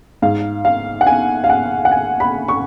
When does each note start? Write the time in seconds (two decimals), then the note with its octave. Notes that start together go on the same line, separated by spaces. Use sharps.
0.22 G#2 F5
0.65 F5
1.01 F#5
1.07 G#5
1.44 F5
1.50 F#5
1.85 F#5
1.92 G#5
2.20 B5
2.48 C#6